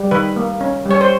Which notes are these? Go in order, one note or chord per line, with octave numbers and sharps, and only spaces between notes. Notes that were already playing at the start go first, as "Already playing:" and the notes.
Already playing: G3
D#3 B4
A#3
C#4
G3 C#5
C5